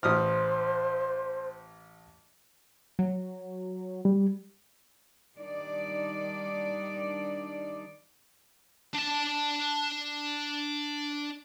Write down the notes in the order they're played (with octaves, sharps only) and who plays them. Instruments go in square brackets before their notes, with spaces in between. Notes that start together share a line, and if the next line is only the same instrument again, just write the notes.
[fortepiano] A1 D#6 F6 [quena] C5
[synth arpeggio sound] F#3
[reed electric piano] G3
[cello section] D#3 G3 D4 D#4 D5
[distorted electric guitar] D4 A5